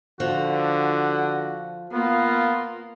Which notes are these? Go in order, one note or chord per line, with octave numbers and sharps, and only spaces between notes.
D3 F3 F#4
A#3 B3 F4